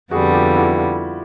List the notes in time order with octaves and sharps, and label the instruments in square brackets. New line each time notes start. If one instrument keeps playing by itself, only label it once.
[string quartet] F2 D3 G3 B3 [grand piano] F#4 G#4
[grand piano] F4 G4
E4 F#4